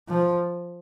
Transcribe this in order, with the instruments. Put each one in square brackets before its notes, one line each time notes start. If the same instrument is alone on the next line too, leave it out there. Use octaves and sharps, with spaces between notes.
[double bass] F3